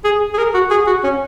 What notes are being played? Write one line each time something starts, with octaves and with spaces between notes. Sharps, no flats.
G#4
G#4
A#4
F#4
G#4
F#4
C#4